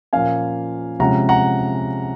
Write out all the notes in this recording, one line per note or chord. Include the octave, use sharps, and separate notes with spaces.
A#2 F3 A#3 C#4 F5 G#5
C3 F3 G#3 C#4 F#5 A#5
F#5 A#5